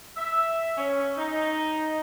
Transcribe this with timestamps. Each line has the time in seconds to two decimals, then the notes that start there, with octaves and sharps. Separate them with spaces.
0.17 E5
0.78 C#4
1.17 D#4